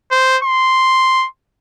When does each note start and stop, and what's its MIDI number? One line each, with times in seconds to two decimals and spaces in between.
0.11 0.37 72
0.44 1.26 84